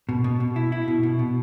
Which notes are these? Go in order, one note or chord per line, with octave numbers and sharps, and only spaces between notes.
B2
B2
B2
E4
E4
B2
B2
B2